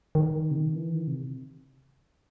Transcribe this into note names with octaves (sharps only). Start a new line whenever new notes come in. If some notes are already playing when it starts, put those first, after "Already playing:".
D#3
C3
D#3
E3
D#3
C3